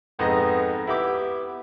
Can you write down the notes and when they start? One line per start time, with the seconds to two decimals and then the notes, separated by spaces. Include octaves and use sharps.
0.19 F2 G#2 B3 D#5
0.87 B3 E4 G4 D6